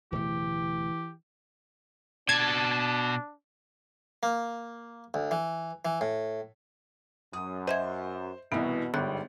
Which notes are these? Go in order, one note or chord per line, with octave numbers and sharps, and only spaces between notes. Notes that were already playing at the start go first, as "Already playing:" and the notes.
D1 B2 E3 A3 G4
B2 D4 A5 G#6
A#3
D2
E3
E3
A2
F#2 D#6
C5 D#5 E5 G#6
C2 B2 E3 B3
G1 G#2 G3 F#6